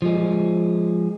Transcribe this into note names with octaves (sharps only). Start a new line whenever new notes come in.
F3 G#3